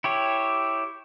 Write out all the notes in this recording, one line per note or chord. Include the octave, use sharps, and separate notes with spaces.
E4 G4 C#5